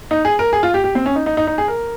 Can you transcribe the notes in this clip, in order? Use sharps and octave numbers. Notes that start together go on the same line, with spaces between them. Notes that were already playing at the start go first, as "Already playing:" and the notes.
D#4
G#4
A#4
G#4
F4
G4
G4
C4
C#4
D#4
D#4
D#4
D#4
G#4
A#4